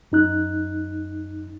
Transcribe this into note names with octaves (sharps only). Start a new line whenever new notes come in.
F#2 D#4 F#6